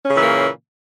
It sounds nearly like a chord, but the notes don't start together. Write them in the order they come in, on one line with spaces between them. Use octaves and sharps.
C#4 C#3 A#2 E3 A#3